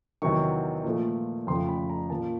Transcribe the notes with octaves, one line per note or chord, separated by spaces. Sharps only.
E2 C3 D#3 F#3 C#6
A#2 F3 A3
F2 C#3 F3 A3 C6
B5
A#5
A#2 F3 A#3 A5